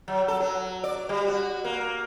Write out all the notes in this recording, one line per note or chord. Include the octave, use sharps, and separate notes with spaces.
F#3
A4
F#3
D5
G3
F#4
A#3